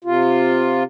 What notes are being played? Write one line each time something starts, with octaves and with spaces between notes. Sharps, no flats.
C3 F4